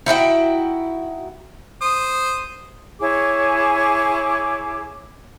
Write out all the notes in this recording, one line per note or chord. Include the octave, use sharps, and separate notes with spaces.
D#4 E4 F#4 G5
C5 D#6
E4 G#4 C#5 D6